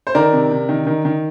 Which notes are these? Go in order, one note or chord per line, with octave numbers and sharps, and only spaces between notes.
C5
D#3 A#4 D5
C3
C3
D#3
D#3
D#3